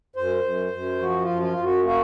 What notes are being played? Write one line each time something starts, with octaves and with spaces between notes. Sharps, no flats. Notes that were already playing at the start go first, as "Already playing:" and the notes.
F#2 C5
F#2
F#2
F3 F#4
F4
F#2
F4
F#2
F#4
A#3 F#4